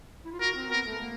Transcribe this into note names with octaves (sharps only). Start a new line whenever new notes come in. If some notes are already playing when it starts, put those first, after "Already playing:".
E4
F4
F#4 A#4
C4
B3 A#4
A3
A#3